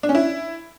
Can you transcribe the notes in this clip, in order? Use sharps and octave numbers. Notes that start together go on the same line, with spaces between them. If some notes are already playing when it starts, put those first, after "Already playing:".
D4
C#4
E4